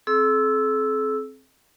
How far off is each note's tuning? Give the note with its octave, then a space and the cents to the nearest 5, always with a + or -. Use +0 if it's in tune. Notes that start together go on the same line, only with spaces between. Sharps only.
C4 +15 A4 -45 E6 +0